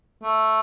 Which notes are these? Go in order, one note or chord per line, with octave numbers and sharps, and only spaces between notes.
A3